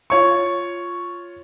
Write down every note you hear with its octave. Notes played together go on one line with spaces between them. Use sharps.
F4 C#5 C#6